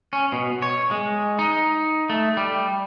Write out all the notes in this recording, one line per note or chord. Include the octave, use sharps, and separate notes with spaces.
C#4
B2
C#5
G#3
D#4
A3
G3